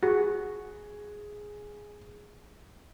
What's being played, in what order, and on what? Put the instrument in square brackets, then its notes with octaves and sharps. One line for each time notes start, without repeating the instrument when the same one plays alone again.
[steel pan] F#4 [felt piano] G#4